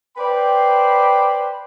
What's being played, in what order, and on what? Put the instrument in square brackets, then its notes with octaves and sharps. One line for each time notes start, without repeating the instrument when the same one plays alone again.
[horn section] B4 C5 D5 G5 B5 C6